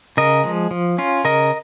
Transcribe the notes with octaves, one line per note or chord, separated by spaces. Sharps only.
C#3 A#4 D#5
F3 G#3
F3
C#4 F4
C#3 A#4 D#5